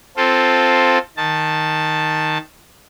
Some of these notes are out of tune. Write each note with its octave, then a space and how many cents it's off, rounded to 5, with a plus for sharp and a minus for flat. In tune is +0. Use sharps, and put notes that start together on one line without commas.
C4 +0 F4 +0 A4 +0
D#3 +0 A5 +0